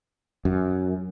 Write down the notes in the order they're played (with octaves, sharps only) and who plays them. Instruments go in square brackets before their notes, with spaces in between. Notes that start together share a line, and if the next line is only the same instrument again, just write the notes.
[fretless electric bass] F#2